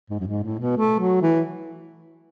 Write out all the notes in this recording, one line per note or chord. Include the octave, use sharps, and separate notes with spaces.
G#2
F#2
G#2
A2
B2
A3
F#3
E3